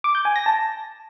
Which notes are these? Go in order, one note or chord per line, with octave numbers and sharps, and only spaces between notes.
D6
G6
G#5
A#6
A5